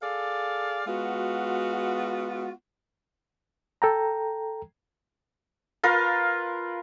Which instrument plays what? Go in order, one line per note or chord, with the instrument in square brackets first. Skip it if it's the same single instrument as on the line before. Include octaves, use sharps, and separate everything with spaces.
[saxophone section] G#4 A4 D5 F5
G#3 B3 F4 F#4
[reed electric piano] A4 G5 A#5
[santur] F4 A#4 B4 F5